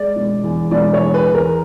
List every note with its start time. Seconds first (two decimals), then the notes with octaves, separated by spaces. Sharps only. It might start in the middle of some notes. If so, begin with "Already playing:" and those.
Already playing: G#3 D5
0.16 E1
0.44 E2
0.71 E1 D5
0.93 C#5
1.00 E2
1.14 B4
1.28 E2
1.34 A#4